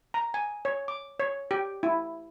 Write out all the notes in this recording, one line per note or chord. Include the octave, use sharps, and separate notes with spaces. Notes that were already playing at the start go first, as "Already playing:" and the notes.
A#5
G#5
C#5
D6
C#5
G4
E4